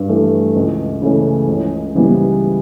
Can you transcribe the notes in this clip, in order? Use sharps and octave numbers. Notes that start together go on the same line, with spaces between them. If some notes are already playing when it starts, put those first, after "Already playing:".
Already playing: G2
E3 A3
C#2
C#3 E3 A3 C#4
C#2
C#3 E3 G3 B3